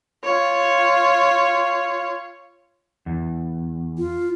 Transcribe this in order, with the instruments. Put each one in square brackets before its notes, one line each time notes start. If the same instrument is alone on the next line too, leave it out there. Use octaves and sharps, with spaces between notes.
[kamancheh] F4 C#5
[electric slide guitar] E2
[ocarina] F4